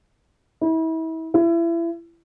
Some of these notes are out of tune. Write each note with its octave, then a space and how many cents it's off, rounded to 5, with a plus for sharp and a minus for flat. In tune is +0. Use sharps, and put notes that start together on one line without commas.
E4 -35
E4 +30